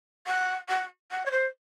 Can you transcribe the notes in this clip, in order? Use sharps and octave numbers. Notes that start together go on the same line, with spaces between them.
F#5
F#5
F#5
C#5
C5